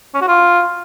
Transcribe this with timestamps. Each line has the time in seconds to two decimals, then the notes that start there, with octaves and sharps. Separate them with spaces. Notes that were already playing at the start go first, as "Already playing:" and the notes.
0.14 C#4
0.21 F#4
0.28 F4